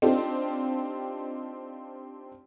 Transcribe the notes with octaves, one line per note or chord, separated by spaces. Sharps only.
C4 D4 D#4 F4 G4